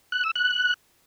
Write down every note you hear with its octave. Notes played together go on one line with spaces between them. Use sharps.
F#6
E6
F#6